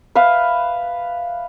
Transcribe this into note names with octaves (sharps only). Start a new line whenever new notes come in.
B4 E5 F5